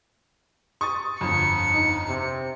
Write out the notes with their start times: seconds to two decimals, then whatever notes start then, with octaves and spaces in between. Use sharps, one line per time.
0.81 C#6 D#6 A6
1.21 G1 F2 C#7
1.74 D#4
2.08 C3